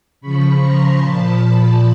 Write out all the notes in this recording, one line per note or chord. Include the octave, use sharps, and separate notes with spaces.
C#3 F3 B5 C#6
A#5 C6
A#2 F3 A5 B5